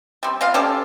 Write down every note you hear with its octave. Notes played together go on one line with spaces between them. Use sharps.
G3 C4
C4 F4 F5
C#4 G4 A4 D5